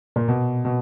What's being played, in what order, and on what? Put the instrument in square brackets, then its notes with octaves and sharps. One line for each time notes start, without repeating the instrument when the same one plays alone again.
[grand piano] A#2
B2
B2